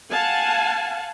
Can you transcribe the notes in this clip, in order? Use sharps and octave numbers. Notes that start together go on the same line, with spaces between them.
F5 F#5 G#5 A5